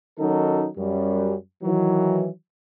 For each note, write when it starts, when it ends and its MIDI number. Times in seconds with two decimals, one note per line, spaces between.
0.19 0.67 51
0.19 0.67 54
0.19 0.67 61
0.19 0.67 63
0.19 0.67 66
0.19 0.67 69
0.77 1.35 42
0.77 1.35 55
1.63 2.28 51
1.63 2.28 52
1.63 2.28 54